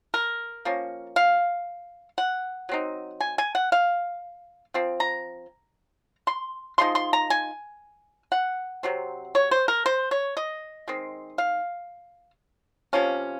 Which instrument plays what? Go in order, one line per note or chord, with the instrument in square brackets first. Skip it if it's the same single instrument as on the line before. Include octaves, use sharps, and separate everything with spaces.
[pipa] A#4
F3 A#3 C#4
F5
F#5
F#3 C4 D#4
G#5
G#5
F#5
F5
F3 C4
A#5
C6
F3 G#3 D#4 C6
C6
A#5
G#5
F#5
C3 F#3 C4
C#5
C5
A#4
C5
C#5
D#5
D#3 G#3 C4
F5
C3 F3 A#3 C#4